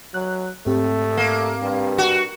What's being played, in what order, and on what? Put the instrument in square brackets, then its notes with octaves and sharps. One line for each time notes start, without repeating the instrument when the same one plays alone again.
[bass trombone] F#3 [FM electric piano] F#6
[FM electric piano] G#2 C4 G4 [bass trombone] A3
[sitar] A#3
[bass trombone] G2
[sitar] F#4